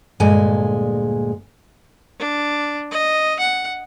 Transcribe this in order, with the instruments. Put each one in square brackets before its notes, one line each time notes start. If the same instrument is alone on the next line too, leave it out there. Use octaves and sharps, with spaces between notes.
[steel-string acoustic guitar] D2 G2 A#2 G#3 G#5
[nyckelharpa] D4
D#5
F#5